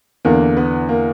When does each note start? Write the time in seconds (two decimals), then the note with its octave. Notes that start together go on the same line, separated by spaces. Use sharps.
0.25 E2 D3 A#3
0.57 B3
0.89 A#3